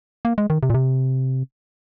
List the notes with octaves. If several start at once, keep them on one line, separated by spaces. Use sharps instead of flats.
A#3
G#3
D#3
C3
A#2
C3